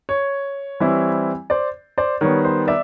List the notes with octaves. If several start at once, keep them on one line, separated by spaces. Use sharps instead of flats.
C#5
E3 G3 C4 E4
C5 D5
C5 D5
D#3 G3 B3 C#5
C5
D5 E5